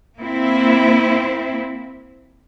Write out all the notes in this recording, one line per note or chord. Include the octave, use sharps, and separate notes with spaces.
A#3 C4 E4